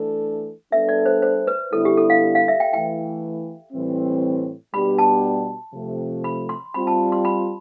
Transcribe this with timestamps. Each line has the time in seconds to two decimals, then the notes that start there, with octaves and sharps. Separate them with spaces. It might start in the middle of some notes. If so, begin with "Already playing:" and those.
Already playing: E3 A3 D4 A4
0.72 G3 B3 D4 A4 E5
0.89 D5
1.06 C5
1.22 C5
1.47 B4
1.72 D3 G3 B3 E4 A4
1.85 G4
1.97 A4
2.10 F5
2.35 F5
2.48 E5
2.60 G5
2.72 E3 A3 E4 G5
3.73 A2 E3 G3 C4
4.74 B2 G3 B3 D4 G4 B5
4.98 A5
5.74 C3 F3 A3
6.24 B5
6.49 C6
6.74 G3 C4 F4 B5
6.87 A5
7.12 C6
7.25 B5